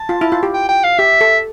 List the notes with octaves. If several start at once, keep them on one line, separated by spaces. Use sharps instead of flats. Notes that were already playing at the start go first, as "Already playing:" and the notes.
Already playing: A5
F4
E4
F4
G4
G5
G5
F5
G4 E5
A4